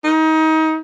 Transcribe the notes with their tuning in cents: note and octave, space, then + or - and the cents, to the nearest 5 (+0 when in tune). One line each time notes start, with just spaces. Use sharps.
D#4 +25